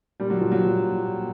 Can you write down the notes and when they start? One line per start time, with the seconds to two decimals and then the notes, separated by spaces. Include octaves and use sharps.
0.20 A#2 G3
0.30 F#3
0.40 A#2 F3
0.52 F#3
0.62 F3
0.83 A#2
1.04 A#2